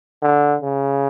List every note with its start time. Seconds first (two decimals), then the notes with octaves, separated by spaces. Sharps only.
0.22 D3
0.62 C#3